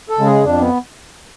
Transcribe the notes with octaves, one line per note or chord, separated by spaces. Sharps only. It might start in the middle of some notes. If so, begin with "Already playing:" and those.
A4
C#3 G#3
G#4
F2 D4
B3